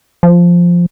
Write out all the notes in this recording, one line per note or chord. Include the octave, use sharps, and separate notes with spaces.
F3